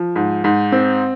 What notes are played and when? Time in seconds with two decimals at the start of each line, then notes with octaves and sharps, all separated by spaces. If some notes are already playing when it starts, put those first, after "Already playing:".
Already playing: F3
0.16 G#2
0.44 G#2
0.72 C4